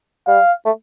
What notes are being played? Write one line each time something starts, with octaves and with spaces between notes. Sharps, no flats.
G3 F5
A3